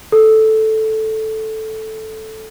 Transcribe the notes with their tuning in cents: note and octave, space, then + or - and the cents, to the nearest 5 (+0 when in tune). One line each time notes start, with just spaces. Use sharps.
A4 -5